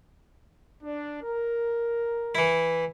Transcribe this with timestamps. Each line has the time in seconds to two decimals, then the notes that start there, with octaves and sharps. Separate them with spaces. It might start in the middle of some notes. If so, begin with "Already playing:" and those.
0.83 D4
1.23 A#4
2.35 E3 E4